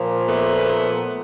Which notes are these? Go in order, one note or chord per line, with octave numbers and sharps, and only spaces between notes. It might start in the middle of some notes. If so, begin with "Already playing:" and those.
Already playing: A#2 F3
A3 B3